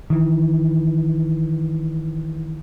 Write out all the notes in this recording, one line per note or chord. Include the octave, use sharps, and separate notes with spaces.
D#3 E3